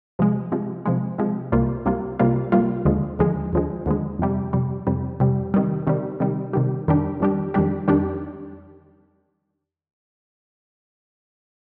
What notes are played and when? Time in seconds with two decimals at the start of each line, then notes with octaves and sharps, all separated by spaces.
0.19 C3 F3 G#3
0.52 C3 F3 G#3
0.86 C3 F3 G#3
1.18 C3 F3 G#3
1.52 C2 C3 G3 A#3 F4
1.86 C2 C3 G3 A#3 F4
2.19 C2 C3 G3 A#3 F4
2.52 C2 C3 G3 A#3 F4
2.85 D#2 D3 F3 G#3
3.19 D#2 D3 F3 G#3
3.53 D#2 D3 F3 G#3
3.86 D#2 D3 F3 G#3
4.19 F2 C3 G3
4.53 F2 C3 G3
4.87 F2 C3 G3
5.20 F2 C3 G3
5.54 C3 D#3 G3
5.87 C3 D#3 G3
6.20 C3 D#3 G3
6.53 C3 D#3 G3
6.88 F2 D#3 G3 D4 G4
7.20 F2 D#3 G3 D4 G4
7.54 F2 D#3 G3 D4 G4
7.88 F2 D#3 G3 D4 G4